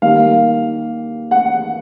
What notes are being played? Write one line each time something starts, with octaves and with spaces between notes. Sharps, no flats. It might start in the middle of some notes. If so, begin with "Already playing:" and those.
D#3 G3 A#3 F5
F#5